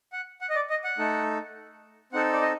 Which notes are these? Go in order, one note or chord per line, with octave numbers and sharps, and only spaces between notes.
F#5
F#5
D#5
D5
D#5
F#5
A3 D#4 A4
C4 D#4 A4 F#5
D5
D#5